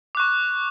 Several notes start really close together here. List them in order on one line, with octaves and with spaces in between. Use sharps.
D6 F#6 C#6